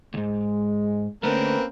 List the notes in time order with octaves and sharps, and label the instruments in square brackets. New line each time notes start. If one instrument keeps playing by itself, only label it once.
[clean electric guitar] D2 G#2 [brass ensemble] G#3
[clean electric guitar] D3 A3 [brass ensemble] A#3 C#4 [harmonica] C4 A#4 B4